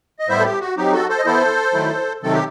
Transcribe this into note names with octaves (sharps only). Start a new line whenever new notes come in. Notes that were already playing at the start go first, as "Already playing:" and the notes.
D#5
A2 G3 B3 E4 C5 E5
A4
G4
F#4
F#3 C4 D#4 G4
F#4 A4
A4 C5
D#5
E3 B3 E4 A4 C5
D#3 F#3 A3 E4
C3 D#3 F#3 C4 A4
G4